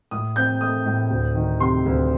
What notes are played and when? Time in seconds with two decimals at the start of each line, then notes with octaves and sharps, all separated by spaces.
0.11 A2 D#6
0.36 C4 G6
0.61 A3 D#6
0.86 A2
1.11 D2
1.35 D#3
1.60 C3 C6
1.85 D2